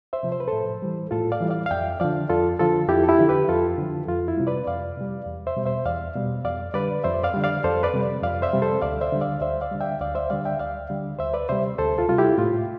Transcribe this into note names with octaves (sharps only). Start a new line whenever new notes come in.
C5 E5
C3 F3
C5
B4
A2 A4 C5
E3 G3
A2 F4 A4
D5 F5
E3 G3
D5 F5
F5
F2 E5 G5
D3 F3 D5 F5
F2 F4 A4
D3 F3 F4 A4
F2 E4 G4
A4
E4 G4
D3 F3
G4 B4
F2 F4 A4
D3 F3
F2 F4
E4
C3 G3
B4 D5
F2 D5 F5
C3 G3
E2
C5 E5
B2 G3
C5 E5
E2 D5 F5
B2 G3
F2 D5 F5
D3 G3 B4 D5
F2 C5 E5
D5 F5
D3 G3
D5 F5
F2 A4 C5
B4 D5
C3 G3
F2 D5 F5
C5 E5
C3 G3
A4 C5
D2 D5 F5
C5 E5
D3 G3
D5 F5
D2 C5 E5
D5 F5
D3 G3
E5 G5
D2 D5 F5
C5 E5
D3 G3 D5 F5
E5 G5
D2 D5 F5
D3 G3
D2 C5 E5
B4 D5
C3 G3 C5 E5
D2 A4 C5
F4 A4
C3 G3 F4
E4 G4
A2 F4